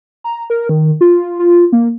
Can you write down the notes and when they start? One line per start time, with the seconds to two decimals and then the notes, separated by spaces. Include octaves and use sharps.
0.24 A#5
0.50 A#4
0.69 D#3
1.01 F4
1.39 F4
1.72 A#3